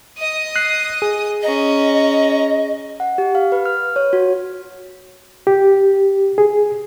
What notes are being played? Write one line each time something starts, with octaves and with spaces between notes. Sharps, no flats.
D#5 D#6
F#6 C7
G#4
C#4 D#5 A#5
F#5
G4
F5
B4
F6
C#5
F#4
G4
G#4